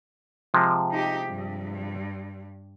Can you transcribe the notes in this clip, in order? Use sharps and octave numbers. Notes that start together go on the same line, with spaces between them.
C3 F3 G#3
D#4 G4
G2